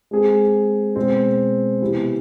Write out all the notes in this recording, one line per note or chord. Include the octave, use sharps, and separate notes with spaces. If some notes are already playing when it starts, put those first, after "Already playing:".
G#3 C4 G#4
B2 G#3 C4
C3 E3 B3 E4